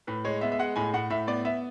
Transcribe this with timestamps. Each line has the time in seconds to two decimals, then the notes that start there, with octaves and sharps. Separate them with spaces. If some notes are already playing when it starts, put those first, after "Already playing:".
0.07 A2 B4
0.25 G#3 C#5
0.41 B3 E5
0.52 E5
0.59 G#3 F#5
0.76 A2 G#5
0.94 A2 F#5
1.10 A2 E5
1.27 B3 D5
1.45 B3 E5